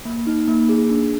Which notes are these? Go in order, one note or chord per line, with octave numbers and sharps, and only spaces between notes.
A#3
D#4
A#3
G#4
D4